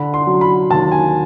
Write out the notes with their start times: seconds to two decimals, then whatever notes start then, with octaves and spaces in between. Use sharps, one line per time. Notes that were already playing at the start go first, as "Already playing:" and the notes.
Already playing: D3 B5
0.14 C6
0.27 F#3
0.41 B5
0.71 D#2 A5
0.92 G#5